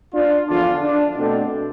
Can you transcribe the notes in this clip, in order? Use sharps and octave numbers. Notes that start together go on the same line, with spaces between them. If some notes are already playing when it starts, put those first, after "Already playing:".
D4 F4
E2 D3 F3 D4 F4
D4
B2 A3 C4 D4